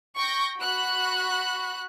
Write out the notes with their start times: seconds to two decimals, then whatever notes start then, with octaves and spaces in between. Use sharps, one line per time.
0.16 G5 C#6 G6 A#6
0.60 F#4 B5 F#6